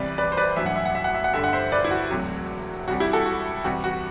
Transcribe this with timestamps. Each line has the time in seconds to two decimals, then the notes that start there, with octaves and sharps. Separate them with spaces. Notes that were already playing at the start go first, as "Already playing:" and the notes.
Already playing: C2 C3 E3 G3 B4 D5
0.18 B4 D5
0.32 C5
0.37 B4 D5
0.56 A1 G2 F#3 E5
0.66 F#5
0.76 E5
0.85 F#5
0.95 E5
1.04 F#5
1.14 E5
1.24 F#5
1.33 G1 G2 D3 G3 E5
1.44 F#5
1.53 C5 E5
1.72 B4 D5
1.84 E4
1.91 F#4
2.10 E1 D2 C3 F#3
2.88 C2 C3 G3 F#4
3.00 E4 G4
3.13 F#4 A4
3.26 F#4
3.64 E2 C3 G3 F#4
3.84 F#4